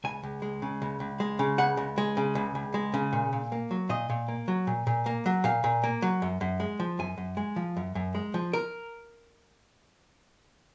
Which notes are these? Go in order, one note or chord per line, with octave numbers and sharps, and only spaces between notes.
C#2 G#5
C#2
G#3
C#3
C#2
C#2
G#3
C#3
C#2 F#5
C#2
G#3
C#3
C#2
C#2
G#3
C#3
A#2
A#2
A#3
F#3
A#2 D#5
A#2
A#3
F#3
A#2
A#2
A#3
F#3
A#2 F5
A#2
A#3
F#3
F#2
F#2
G#3
F3
F#2 G#5
F#2
G#3
F3
F#2
F#2
G#3
F3
A#4